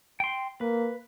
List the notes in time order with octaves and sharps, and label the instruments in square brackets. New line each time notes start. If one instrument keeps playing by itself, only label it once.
[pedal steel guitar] G5 C6
[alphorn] A#3 [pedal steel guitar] B4